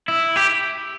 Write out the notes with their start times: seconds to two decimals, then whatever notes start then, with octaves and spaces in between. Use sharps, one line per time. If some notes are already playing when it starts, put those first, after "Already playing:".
0.08 E4
0.36 G4